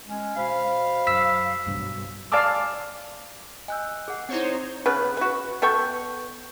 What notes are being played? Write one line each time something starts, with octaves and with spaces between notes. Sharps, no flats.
G#3 C#4
B2 C5 F5 B5
F#2 E6 B6
B1 G2
D5 F5 G#5 A5 D6 E6
D#5 G#5 E6 F#6 G6
G#4 F#5
C4 D#4 E4 C5 C#5 F#5
C#3 B3 B4
F#4 B4
B3 A4 G5 C#6